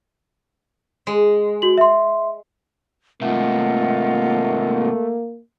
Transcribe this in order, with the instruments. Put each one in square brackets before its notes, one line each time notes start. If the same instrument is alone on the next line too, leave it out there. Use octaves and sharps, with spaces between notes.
[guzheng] G#3
[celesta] F#4 F#7
E5 C6
[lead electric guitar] G#2 C3 [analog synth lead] A3 [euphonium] A#3 [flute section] F4 D#5 F#5